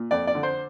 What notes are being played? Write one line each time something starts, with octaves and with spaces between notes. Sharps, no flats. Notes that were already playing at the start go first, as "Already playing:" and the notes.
Already playing: A#2
F2 D5
D5
D3
C5